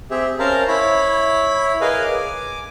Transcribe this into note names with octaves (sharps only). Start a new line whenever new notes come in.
C4 G4 G#4 E5
C#4 A#4 C5 F5 A5 A#5
E4 C#5 B5
G#4 A#4 B4 D#5 F5 G#5
G#5 D6